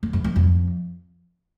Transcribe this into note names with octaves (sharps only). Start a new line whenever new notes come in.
F2
F#2
F#2
F2